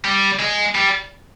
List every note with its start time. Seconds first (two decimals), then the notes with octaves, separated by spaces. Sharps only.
0.05 G3
0.40 G#3
0.75 G3